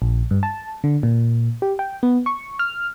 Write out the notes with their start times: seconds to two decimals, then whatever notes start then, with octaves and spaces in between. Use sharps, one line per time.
0.02 A#1
0.31 G2
0.43 A5
0.84 D3
1.03 A#2
1.62 G4
1.79 G5
2.03 B3
2.26 C#6
2.59 F6